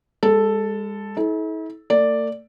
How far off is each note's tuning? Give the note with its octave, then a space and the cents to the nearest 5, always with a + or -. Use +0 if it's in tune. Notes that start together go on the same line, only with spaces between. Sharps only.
G#3 -40 A4 +0
E4 -45 A4 -40
A3 +45 D5 +0